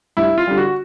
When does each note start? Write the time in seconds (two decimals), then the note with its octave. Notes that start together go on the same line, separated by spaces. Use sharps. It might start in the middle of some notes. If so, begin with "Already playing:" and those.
0.17 G2 E4
0.38 F4
0.47 D3 G3
0.58 F#4